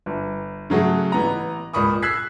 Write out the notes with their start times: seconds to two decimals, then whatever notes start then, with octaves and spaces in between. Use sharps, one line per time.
0.06 G1
0.70 C#3 F#3 A3 F#4 G#4
1.12 A1 B3 A#5
1.73 C#2 A#2 B5 C#6 D#6
2.02 E6 F#6 G#6 B6 C7